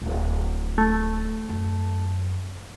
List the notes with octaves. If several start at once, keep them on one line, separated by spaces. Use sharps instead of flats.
D1
A3
F#2